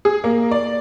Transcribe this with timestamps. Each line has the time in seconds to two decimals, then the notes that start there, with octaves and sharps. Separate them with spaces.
0.05 G#4
0.24 A#3
0.51 D5